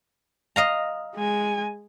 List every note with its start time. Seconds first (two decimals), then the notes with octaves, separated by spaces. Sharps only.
0.56 D#5 F5 A#5
1.15 G#3 G#5